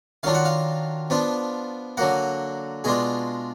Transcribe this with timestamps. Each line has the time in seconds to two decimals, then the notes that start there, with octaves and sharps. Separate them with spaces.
0.23 D#3 F#3 D4 F4 F5
0.34 F#5
0.45 F5
1.10 F3 B3 D4 F4
1.97 D3 F#3 A#3 F#5
2.84 B2 G#3 D4 F4 G#4